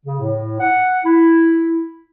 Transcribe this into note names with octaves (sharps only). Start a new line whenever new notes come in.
C#3
A2
F#5
E4